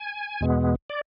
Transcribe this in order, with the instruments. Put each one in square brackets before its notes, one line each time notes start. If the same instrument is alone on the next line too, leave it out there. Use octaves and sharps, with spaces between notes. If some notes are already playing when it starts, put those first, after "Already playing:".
Already playing: [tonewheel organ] G#5
E2 B2 G#3 B3
D5